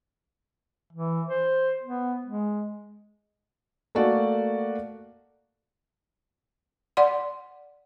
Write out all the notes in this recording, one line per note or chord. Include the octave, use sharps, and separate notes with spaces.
E3
C5
B3
G#3
A3 A#3 F#4 D5
D5 F#5 C6